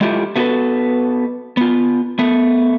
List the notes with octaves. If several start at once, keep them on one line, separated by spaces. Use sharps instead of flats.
G#3 A3 E4 F4 G4
A3 B3 F#4 G4 A4 B4
B3 F4
A3 B3